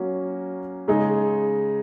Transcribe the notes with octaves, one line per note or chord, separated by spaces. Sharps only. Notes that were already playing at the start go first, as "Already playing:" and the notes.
Already playing: F#3 A#3 C#4 F#4
C#3 G#3 D#4